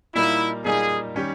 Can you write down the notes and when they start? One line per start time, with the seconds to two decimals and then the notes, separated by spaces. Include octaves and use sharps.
0.15 A#2 G3 A#3 D#4 E4
0.64 A#2 G3 A#3 D#4 G#4
1.15 D#3 G3 C#4 G4